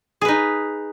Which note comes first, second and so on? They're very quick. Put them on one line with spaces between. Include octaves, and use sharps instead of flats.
G#4 B4 D#4